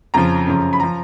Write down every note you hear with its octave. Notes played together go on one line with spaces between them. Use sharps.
F2 C#3 F3 A#5
F#2 C#3 F3
B5
F3 A#5